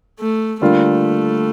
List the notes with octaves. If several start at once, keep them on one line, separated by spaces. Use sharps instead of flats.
A3
D3 G3 A3 A#3 F4